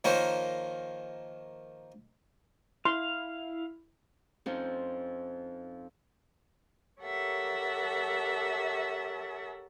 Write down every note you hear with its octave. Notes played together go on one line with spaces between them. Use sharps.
D#3 F3 A#3 A#4 C5 C#5
E4 F5 C6
F2 C4 C#4 D#4 C5
G4 A4 A#4 C#5 E5 F#5